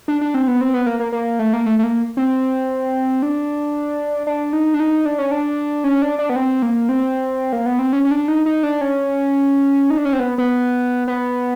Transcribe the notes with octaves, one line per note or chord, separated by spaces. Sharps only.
D4
D4
C4
B3
C4
B3
A#3
A#3
A#3
A3
A#3
A3
A3
A#3
C4
D4
D4
D#4
D4
D#4
D4
C#4
D4
C#4
D4
D4
B3
C4
A#3
C4
A#3
B3
C4
C#4
C#4
D4
D#4
D#4
D4
C#4
D#4
D4
C#4
C4
B3
B3
B3